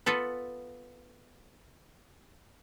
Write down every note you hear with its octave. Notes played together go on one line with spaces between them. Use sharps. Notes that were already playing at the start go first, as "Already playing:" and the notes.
B3 F4 A4 B4